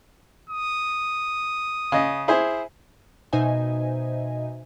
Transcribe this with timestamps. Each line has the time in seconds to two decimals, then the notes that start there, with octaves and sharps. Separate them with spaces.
0.50 D#6
1.92 C#3 D#5
2.28 E4 G#4 C5
3.33 B2 D#4 C5 D#5 E5 G#5